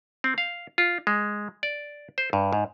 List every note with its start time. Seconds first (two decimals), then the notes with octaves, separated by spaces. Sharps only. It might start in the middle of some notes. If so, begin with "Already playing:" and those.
0.24 C4
0.38 F5
0.78 F4
1.07 G#3
1.63 D5
2.18 C5
2.33 G2
2.53 G#2